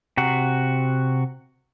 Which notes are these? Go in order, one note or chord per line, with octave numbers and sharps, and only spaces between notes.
C3 F#4